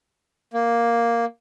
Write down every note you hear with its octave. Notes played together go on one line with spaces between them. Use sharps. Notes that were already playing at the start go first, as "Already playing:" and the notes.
A#3